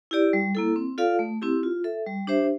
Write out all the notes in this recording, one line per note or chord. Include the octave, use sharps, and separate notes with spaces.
E4 G4 D5
G3
A#3 E4 A4
C4
F4 A4 D5 F5
A3
C4 E4 G4
F4
A4 E5
G3
D4 G4 C5 E5